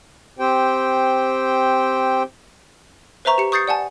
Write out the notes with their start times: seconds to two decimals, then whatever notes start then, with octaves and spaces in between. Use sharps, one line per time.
0.39 C4 G4 C5 G5
3.25 B4 C5 E5 A#5 C#6
3.38 G4 C#7
3.52 C#6 D#6 G6 A6 C7 C#7
3.68 D5 F#5 G#5 A5